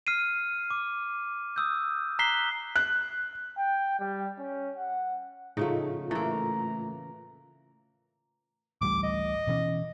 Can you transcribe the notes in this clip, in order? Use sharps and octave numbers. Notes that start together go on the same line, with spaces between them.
F6 C7 D#7
D6
D#6 E6 G6
A#5 F#6 B6 C7 G7
F#6
G5
G3
C#4
F#5
A2 C#3 F3 A3 D#4 F4
E3 A3 A#3 A#5
A1 D2 G3 D6
D#5
B2 E3 C#4